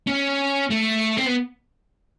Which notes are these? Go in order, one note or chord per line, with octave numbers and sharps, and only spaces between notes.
C#4
A3
C4
B3